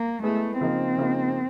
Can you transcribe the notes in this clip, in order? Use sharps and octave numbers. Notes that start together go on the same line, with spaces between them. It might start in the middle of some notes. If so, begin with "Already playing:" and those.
Already playing: A#3
G#3 A3 B3 E4 G#4
C#3 F3 A#3 C4 D#4
C#3 F3 A#3 D#4